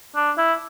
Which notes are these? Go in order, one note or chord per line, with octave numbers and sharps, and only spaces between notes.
D4
E4